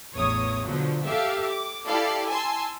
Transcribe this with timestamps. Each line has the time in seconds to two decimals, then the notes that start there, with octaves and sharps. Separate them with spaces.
0.14 A1 E2 C#5 D#6
0.68 B2 D3 F3 F#3
1.07 G4 A4 E5 F5
1.50 D6
1.86 E4 G4 A4 D5 F5
2.28 G#5 A5 C6 E6